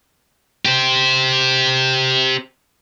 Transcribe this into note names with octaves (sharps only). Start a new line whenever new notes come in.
G4 C5